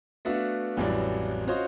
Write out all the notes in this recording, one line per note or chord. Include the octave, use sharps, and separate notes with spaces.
A3 B3 D4 F#4 E5 F5
A1 F2 E3 F#3 G3 D5
C#4 F4 F#4 C5 C#5 D#5